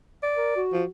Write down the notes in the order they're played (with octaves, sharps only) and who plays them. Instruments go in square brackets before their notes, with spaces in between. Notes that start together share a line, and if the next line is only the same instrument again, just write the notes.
[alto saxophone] D5
[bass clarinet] A#4
F#4
[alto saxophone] F3